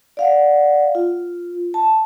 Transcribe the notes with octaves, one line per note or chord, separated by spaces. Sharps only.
D5 F5 F#5
F4
A5